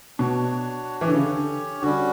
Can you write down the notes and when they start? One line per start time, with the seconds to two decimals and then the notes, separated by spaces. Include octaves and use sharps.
0.18 B2 D4 F#4 C#5
1.01 E3 C#4 G4 C#5
1.08 D3
1.14 C#3
1.23 D3
1.82 D3 G3 C#4 F#4